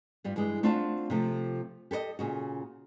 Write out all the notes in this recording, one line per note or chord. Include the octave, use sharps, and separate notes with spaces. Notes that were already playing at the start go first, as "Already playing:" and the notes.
G2 G3 F4
G2 E3 G#3
A3 C4 D4 F4 F#5 A5
C3 F3 A3
G4 A4 B4 D#5
A#2 C#3 F#4